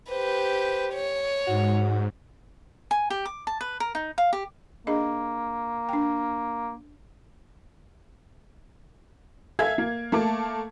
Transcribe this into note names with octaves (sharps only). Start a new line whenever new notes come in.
G4 B4 C5
C#5
G#2 F#4
G#5
G4
D6
A5
B4
A#4
D#4
F5
G4
A#3 D4 G#4 D#5
D4 G5
A4 E5 F5 G#5 G#6
A#3
A3 A#3 A5 D6